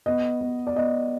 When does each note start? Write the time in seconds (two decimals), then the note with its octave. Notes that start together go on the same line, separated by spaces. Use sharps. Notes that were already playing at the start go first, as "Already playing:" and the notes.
0.06 B3 D#5
0.41 B3
0.67 D5
0.75 B3 D#5